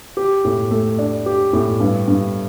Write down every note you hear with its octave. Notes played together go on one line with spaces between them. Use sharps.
G4
A2
A3
D4
G4
A2
G2
G2